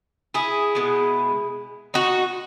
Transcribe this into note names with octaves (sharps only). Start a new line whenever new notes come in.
E4 G#4
B2 G#3
D#4 F#4